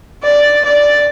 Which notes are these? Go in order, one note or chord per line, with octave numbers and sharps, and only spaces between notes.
D5
D5